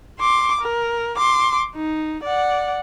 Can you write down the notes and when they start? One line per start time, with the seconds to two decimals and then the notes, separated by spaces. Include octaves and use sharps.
0.20 C6 D6
0.61 A#4
1.17 C6 D6
1.76 D#4
2.24 D5 F#5